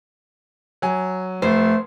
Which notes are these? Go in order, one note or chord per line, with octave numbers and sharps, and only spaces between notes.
F#3 G#5
F1 A3 C5